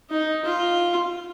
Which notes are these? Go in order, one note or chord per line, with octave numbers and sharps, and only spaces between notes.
D#4
F4